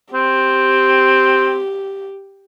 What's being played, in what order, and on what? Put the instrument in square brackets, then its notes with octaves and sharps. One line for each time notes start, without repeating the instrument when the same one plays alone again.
[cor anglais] C4 [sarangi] G4